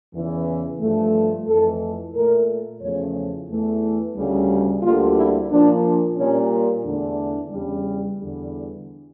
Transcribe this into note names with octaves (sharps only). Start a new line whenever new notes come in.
E2 C#3 E3
G2 F3 A3
F2 E3 A3 A4
A#2 A3 A#4
E2 C#3 F3 A3 C#5
E2 E3 A3
D2 C#3 G3
D2 D3 G3 A#3 F4
E4
A#2 F3 A#3 D4
A#2 G3 A#3 C#4
E2 D3 A3 D4
E2 C#3 G3
E2 D3 G3